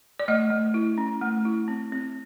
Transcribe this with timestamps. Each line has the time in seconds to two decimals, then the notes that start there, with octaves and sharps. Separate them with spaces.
0.20 D5
0.28 A3 D#5
0.50 A3
0.74 E4
0.98 C#4
1.21 A3
1.45 E4
1.68 C4
1.92 C4